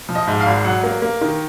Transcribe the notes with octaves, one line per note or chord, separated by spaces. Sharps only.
F3
D#5
G#2
F5
G#1
F#3 F#5
A#3
A#3
D#3